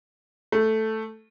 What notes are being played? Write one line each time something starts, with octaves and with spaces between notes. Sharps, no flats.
A3